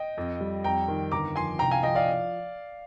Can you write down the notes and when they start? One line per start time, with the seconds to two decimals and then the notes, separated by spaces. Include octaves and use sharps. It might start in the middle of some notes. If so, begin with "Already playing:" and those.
Already playing: D#5 G5
0.17 F2
0.40 G3
0.64 F2 G5 A#5
0.88 D#3
1.12 G1 A#5 D6
1.36 F3 G#5 C6
1.59 C2 G5 A#5
1.71 F5 G#5
1.83 F3 D#5 G5
1.95 D5 F5